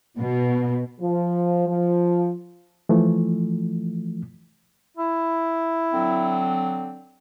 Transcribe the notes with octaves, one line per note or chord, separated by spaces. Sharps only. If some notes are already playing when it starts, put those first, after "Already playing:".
B2
F3
F3
E3 F3 A3
E4
D3 F#3 C4